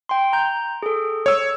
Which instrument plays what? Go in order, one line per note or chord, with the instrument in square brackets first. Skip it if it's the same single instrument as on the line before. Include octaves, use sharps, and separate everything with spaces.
[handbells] G5 C6
A#5 G6
G#4 A4
[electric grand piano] C#5 E6